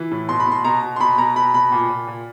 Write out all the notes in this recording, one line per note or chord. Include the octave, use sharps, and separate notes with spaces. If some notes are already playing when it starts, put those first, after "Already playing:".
Already playing: E3
A2
B2 C6
B5
B2 C6
B2 A#5
B2
C6
B2 B5
B2 A#5
B2 B5
B2 B5
A#2
A#2
A#2